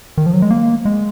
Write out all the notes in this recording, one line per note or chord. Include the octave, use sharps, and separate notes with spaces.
D#3
F3
F#3
G#3
A#3
G#3